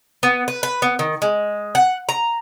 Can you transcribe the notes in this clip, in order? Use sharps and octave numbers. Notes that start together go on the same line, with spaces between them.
B3
B4
B4
B3
D#3
G#3
F#5
A#5